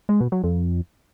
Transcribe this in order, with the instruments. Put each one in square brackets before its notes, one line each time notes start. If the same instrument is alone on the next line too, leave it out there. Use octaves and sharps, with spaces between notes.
[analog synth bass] G#3
B2
F#3
F2